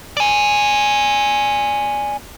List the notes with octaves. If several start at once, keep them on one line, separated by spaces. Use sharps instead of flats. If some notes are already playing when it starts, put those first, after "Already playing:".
D5 G#5